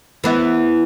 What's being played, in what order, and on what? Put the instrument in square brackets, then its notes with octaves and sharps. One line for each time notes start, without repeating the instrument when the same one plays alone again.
[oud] E3 B3 E4